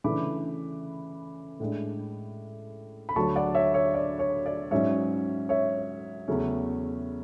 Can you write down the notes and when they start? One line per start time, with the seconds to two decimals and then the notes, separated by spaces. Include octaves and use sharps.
0.04 C#3 E3 A3 D4 B5 D6
1.60 A2 G#3 D4
3.09 B5
3.16 D2 D3 F#3 A5 C#6
3.35 D5 F#5
3.55 C#5 E5
3.74 C#5 E5
3.94 D5
4.19 C#5
4.46 D5
4.71 G#2 F#3 C#4 C#5 E5
5.49 C#5 E5
6.28 E2 C#3 F#3 A3 C#4